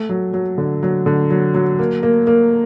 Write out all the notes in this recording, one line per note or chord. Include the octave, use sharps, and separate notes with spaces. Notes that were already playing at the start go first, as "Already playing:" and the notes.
Already playing: A3
F#3
F#3
D3
F#3
D3
F#3
F#3
A#3
A#3
A#3